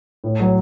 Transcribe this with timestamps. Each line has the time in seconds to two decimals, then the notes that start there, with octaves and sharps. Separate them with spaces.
0.24 A2
0.40 F#3